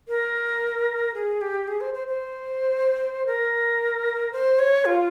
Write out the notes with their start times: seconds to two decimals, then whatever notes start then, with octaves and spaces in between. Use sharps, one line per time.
0.08 A#4
1.14 G#4
1.41 G4
1.68 G#4
1.81 C5
1.94 C5
2.07 C5
3.26 A#4
4.32 C5
4.59 C#5
4.85 F4